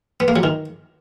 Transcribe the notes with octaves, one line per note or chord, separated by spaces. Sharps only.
B3
A#3
F#3
D#3